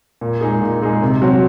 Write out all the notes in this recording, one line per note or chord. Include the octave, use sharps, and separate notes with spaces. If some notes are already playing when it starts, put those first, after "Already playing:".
A#2
G#3 D#4 G#4
A#2
G#3 D#4 G#4
C3
F#3 C4 F#4